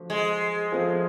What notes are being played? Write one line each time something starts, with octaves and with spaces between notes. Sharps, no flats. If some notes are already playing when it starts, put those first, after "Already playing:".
Already playing: F3 A3 D4 F#4
G#3
F3 A3 C4 F4 G#4